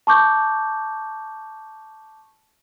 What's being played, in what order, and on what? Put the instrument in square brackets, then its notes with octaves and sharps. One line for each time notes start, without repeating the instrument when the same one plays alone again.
[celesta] A5 C#6 D6 G6